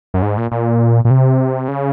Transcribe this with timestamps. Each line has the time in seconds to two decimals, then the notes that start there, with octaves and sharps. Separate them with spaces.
0.14 F#2
0.22 G#2
0.37 A#2
0.51 A#2
1.05 A#2
1.10 C3
1.68 C#3